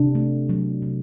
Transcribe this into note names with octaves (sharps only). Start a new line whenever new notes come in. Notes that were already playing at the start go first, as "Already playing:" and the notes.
Already playing: C3 D4
A3
F#3
C3